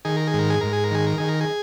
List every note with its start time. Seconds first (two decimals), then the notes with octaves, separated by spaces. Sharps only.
0.05 D#3 G#4
0.16 A#4
0.27 G#4
0.34 G#2
0.39 A#4
0.50 G#4
0.61 G#2 A#4
0.73 G#4
0.84 A#4
0.91 D#3 G#4
1.07 A#4
1.18 D#3 G#4
1.28 A#4
1.41 G#4